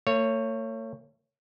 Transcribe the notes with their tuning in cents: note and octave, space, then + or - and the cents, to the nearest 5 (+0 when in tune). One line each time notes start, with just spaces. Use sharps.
A3 +45 C#5 +0